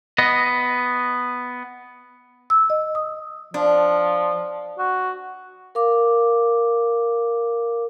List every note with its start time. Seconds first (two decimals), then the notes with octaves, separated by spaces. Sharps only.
0.18 B3 D#5
2.50 E6
2.70 D#5
2.95 D#6
3.54 F3 D4
4.79 F#4
5.75 A#4 F5 D6